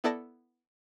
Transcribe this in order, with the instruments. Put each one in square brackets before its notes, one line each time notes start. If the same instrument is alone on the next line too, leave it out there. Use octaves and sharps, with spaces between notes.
[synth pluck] B3 E4 A4 D5 A5 A#6